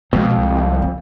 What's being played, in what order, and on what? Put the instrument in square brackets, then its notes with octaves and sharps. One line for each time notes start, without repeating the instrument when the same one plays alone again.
[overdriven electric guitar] F2 [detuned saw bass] B2 [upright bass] G#3
[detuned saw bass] C2
[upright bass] A3